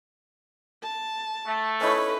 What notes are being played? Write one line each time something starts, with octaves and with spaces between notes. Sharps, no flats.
A5
A3
C#4 D#4 E4 A4 B4 C#5